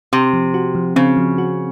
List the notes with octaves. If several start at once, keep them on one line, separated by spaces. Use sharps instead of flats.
C3 C4
F3
F#4
F3
C#3 C4
F3
F#4